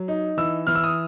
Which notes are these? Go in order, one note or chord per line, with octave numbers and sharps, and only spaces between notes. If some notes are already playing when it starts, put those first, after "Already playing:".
Already playing: F#3
D#4
E3 E6
E3 F6
E6
D#6